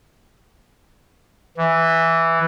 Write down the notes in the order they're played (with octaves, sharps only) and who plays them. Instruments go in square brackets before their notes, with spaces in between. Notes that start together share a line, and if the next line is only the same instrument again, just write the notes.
[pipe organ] E3